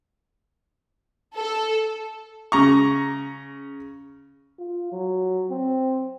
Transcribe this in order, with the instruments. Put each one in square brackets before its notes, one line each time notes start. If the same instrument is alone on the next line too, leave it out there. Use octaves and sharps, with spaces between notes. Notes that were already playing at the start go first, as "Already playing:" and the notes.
[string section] A4
[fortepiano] C#3 A#5 C#6
[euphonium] F4
F#3
C4